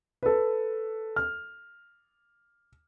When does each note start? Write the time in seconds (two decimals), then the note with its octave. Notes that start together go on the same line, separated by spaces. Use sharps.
0.23 A4 B4
1.16 F6